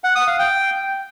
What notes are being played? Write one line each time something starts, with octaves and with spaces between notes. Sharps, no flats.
F#5
D#6
F5
G5